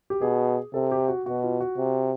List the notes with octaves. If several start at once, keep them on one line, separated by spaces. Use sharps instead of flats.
G4
B2 G#4
C3 A4
G4
F#4
B2 F#4
F4
F#4
C3